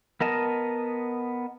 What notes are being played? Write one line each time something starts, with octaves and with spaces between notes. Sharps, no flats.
B3 A#4 D#5 A5